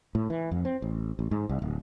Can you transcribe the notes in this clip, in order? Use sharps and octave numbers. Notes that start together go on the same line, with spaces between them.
A2
E3
F2
C4
A1
A1
G#2
C2
D1